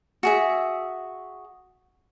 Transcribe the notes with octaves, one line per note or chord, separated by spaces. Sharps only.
F#4 G#4 E5